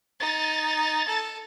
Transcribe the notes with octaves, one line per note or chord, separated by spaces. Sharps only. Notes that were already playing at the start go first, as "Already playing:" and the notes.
D#4 A6
A4